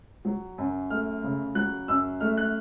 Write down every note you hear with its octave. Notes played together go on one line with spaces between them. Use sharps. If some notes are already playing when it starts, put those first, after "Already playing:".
F#3
F#2
A3 F6
C#3
F#3 F#6
F#2 E6
A3 F6
F#6